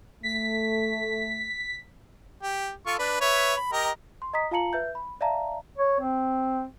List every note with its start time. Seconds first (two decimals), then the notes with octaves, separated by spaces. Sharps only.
0.23 A3 B6
2.42 G4
2.86 F4 A4 C#6
2.99 D4 B4
3.21 B4 C#5 E5
3.56 B5
3.72 G4 A#4 D#5
4.22 C6
4.33 D#5 A#5 D#6 B6
4.51 F4 F5 A5 A#5 C#7 F#7
4.73 B4 E5 G6
4.95 B5
5.21 D5 E5 F5 A5 A#5
5.78 C#5
6.00 C4